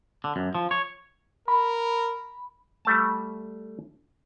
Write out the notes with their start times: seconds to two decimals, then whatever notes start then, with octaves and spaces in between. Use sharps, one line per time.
0.24 D3
0.36 F#2
0.55 F3
0.71 C#5
1.48 A#4 B5
2.85 G3 A3 A5